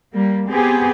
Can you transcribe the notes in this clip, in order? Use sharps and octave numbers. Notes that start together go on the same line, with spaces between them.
G3 A#3
B3 C4 G4 G#4